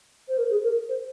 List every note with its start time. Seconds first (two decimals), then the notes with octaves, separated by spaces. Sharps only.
0.28 C5
0.38 A#4
0.50 G#4
0.63 A#4
0.89 C5